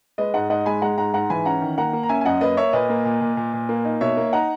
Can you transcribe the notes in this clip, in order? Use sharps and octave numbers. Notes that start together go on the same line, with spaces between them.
G#3 B4 D#5
G#2 D#5 F#5
G#2 D#5 F#5
G#3 G#5 B5
G#3 F#5 A#5
G#2 F#5 A#5
G#2 F#5 A#5
E3 G#5 B5
C#4 F#5 A#5
D#3
A#3 F#5 A#5
A#3
A#5
C#4 E5 G#5
G#5
F#2 D#5 F#5
A#3 B4 D#5
A#3 C#5 E5
A#2 B4 D#5
A#3
A#2
A#2
A#2
A#2
A#3
D#4
B2 C#5 E5
A#3
D#4 F#5 A#5